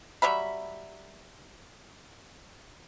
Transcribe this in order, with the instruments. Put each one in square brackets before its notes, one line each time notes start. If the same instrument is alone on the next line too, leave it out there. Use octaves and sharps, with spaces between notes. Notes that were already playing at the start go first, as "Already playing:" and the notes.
[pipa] F#3 G3 E5 B5